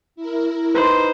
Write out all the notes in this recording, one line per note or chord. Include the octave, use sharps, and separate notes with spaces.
E4 A#4
D#4 B4 C5 B5 C6